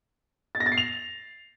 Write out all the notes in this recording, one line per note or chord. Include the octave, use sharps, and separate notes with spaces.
A6
A#6
A6
C7
F7